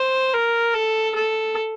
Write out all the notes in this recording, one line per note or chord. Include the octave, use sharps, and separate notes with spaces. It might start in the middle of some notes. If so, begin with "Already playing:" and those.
Already playing: C5
A#4
A4
A4